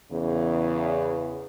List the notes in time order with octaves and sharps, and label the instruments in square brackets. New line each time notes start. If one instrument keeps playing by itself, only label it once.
[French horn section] E2 C#3